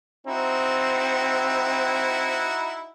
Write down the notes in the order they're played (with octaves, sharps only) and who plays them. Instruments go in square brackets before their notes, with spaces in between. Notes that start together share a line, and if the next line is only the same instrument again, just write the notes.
[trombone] C4 [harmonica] D#4 E4 F#4